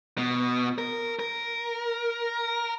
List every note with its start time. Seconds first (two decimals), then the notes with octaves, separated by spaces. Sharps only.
0.18 B2
0.78 A#4
1.19 A#4